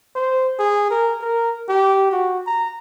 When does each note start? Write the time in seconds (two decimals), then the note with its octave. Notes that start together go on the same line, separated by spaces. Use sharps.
0.16 C5
0.59 G#4
0.90 A#4
1.21 A#4
1.69 G4
2.12 F#4
2.47 A#5